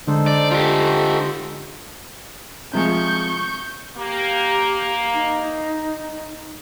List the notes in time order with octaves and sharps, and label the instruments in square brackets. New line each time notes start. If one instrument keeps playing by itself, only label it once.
[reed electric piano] D3 G#3 D4 [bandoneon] D#4 A4 C5
[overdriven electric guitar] D5
F4 G4
[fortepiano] C3 F3 G#3 [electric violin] C#6 G6
[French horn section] A#3 [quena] G4
[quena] D#4